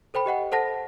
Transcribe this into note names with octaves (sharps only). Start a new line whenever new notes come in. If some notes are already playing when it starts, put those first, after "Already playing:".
A4 C5 G5 B5
G4 D#5 F#5 G5
A4 C5 F#5 A5 A#6